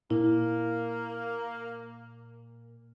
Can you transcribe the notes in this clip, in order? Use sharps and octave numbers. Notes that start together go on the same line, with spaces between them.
A#2 A#3 E4